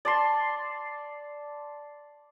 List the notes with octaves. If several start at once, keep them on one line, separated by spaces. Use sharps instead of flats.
D5 A5 C6